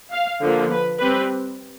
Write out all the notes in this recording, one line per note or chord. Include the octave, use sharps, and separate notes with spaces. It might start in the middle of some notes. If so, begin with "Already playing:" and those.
F5
D3 F3 A#3
B4
G3 C4 B4